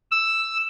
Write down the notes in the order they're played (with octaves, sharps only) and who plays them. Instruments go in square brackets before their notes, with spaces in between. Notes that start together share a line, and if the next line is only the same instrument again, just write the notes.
[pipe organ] E6